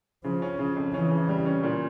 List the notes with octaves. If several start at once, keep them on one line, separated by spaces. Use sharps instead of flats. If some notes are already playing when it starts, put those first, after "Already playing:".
C#3 F3
C#4
C#3
F2
E3 C#4
C#3
G3
C#4
A#2